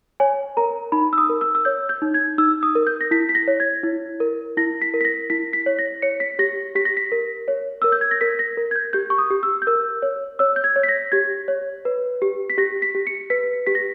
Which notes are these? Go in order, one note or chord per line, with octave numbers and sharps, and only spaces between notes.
C#5 G#5
A#4 A#5
D#4 B5
E6
D#6
A#4
E6
E6
C#5 G6
G6
D#4
G#6
D#4 E6
D#6
A#4
G6
A#6
E4 B6
B6
A#6
C#5
G#6
E4
A#4
E4 A#6
B6
A#4
B6
A#6
E4 B6
B6
C#5
A#6
C#5 C#7
B6
G4 A#6
G4 B6
A#6
B6
A#4
C#5
A#4 E6
G6
G#6
A#6
A#4 B6
A#6
A#4
G#6
G6
G4 G6
C#6
D#6
G4
E6
G6
A#4 E6
C#5
C#5 E6
G6
G#6
C#5
B6
A#6
G4 G#6
C#5
B4
G4
B6
G4 A#6
B6
G4
C#7
B4 B6
G4 B6
A#6